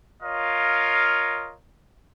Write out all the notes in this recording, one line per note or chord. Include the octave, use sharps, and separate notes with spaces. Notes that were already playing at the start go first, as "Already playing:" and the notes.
F4 A#4 C#5 D#5 F5